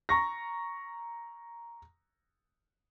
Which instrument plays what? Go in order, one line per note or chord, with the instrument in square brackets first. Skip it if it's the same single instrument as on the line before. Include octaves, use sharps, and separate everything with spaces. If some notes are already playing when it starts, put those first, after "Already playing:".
[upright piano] A#5 C#6 A#6